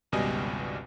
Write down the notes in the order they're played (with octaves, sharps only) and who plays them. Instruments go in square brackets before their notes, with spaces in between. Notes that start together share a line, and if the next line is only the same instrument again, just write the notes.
[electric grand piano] G#1 C#2 B2 G3 D#5 G#5